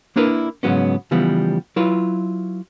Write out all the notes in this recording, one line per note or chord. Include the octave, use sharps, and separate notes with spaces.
A#3 D4 E4 A#4 B4
G#2 C#3 F#3 B3 C#4
C#3 E3 F3 G3 B3
F#3 E4 F4 B4